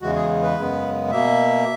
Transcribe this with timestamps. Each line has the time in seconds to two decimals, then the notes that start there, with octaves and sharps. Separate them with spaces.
0.02 E2 C#3 E3 G#3 F#4
0.16 G#4
0.43 B4
0.56 F#2 C#3 G#3 B3
1.11 B2 A#3 E5